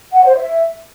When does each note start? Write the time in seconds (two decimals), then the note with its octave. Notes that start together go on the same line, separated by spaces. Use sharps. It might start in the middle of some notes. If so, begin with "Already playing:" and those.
0.13 F#5
0.24 C5
0.36 E5